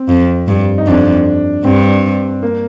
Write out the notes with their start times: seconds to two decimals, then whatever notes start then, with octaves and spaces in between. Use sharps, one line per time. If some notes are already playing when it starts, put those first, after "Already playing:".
Already playing: C4
0.09 F2
0.48 G2
0.78 D#4
0.87 F2 D4
1.64 G2 C4
2.43 A#3